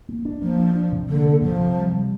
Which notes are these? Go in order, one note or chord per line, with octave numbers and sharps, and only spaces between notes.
A#3
D4
F3 A#3
D4
D4
C3
D3 A#3
A#3
C3 F3
C3
G3
G3